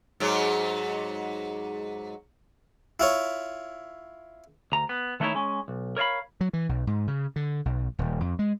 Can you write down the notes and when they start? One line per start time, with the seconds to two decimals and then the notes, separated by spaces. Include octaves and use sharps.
0.20 G#2 F#3
3.00 E4 F4 C#5
4.72 D2 A#5
4.89 B3
5.20 D#3 A3 B3 D#4 E4 C#5
5.34 G#3 C#4
5.68 B1
5.97 A#4 C#5 D5 F5 B5
6.41 F#3
6.53 E3
6.69 B1
6.87 G#2
7.08 C#3
7.36 D3
7.65 B1
7.99 D#1
8.20 F2
8.39 G#3